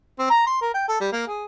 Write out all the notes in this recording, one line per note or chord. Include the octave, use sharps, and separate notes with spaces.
C4
A#5
C6
A#4
G5
A4
G3
A#3
G#4